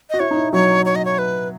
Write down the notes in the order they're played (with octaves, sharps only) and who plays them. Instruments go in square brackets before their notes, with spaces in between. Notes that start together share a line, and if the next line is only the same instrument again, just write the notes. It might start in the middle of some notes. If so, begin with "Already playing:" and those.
[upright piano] F#4 [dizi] D#5
[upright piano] E4 [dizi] C#5
[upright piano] D#4
E4
[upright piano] F#3 [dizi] C#5
[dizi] C#5
D#5
C#5
B4